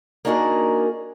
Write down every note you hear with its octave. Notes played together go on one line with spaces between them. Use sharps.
A#3 D4 D#4 F#4 G#4 A#4